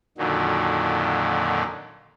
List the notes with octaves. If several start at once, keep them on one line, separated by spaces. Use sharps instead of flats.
F2 A#2 D3 D#3 F#3